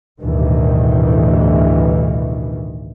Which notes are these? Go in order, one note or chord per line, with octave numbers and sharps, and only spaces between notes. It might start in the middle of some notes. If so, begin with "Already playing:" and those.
A1 D2 G2 B2 D#3 E3